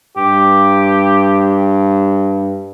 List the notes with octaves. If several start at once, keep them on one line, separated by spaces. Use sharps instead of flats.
G2 G4